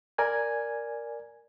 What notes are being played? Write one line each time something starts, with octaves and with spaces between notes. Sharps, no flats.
A#4 D5 G#5 G#6